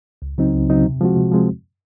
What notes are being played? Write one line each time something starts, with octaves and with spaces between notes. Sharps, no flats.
C#2
C#3 F#3 C4 D#4
C#2
C#3 F#3 C4 D#4
C3
F3 G#3 C4 F#4
C3
F3 G#3 C4